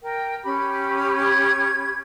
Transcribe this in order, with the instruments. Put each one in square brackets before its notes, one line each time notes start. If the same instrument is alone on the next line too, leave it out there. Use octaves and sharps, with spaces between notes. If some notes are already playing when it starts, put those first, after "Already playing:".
[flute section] A#4 G5
C#4 G4 B5
[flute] G#6